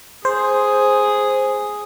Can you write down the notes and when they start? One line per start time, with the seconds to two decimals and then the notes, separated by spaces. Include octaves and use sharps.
0.25 G#4 C5